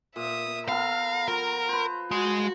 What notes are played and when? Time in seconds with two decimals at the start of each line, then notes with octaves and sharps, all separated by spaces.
0.16 A#2 E5 D#6
0.68 B3 A4 A#4 F5 A#5
1.28 F3 A#4
1.69 B4 C5
2.11 G#3 F#4